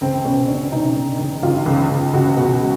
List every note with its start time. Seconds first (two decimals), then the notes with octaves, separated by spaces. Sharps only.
0.01 C#2 C4
0.25 B2 C#4
0.48 C#2 D4
0.72 B2 D#4
0.96 B2
1.19 C#2
1.43 C#2 F4
1.66 C#2
1.89 C#2
2.13 C#2 F#4
2.37 B2
2.61 G#3